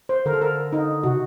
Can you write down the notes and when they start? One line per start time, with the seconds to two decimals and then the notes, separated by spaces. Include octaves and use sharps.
0.09 C5
0.25 D3 A#4
0.33 A4
0.42 A#4
0.72 D#4
1.03 C3 F#4